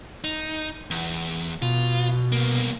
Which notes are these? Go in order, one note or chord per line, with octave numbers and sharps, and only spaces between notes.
D#4
E2
B2 F4
C2 A#3